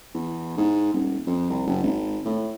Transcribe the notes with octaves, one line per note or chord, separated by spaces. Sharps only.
E2
G#2
D#1
F2
C2
F#1
G#1
A2